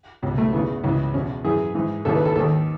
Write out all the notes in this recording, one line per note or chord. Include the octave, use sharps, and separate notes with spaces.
C#2 B2
A3
E2 C#3 E3 B3
C#2 C#3 E3
E2 B2 C#4
F#2 E3 G#4
G#2 E3
D#2 C#3 E3 A4
B4
A4
D#2 D#3 A4